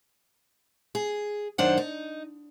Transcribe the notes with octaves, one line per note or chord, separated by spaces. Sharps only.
G#4
F#2 D#3 D4 C5 F#5
D#4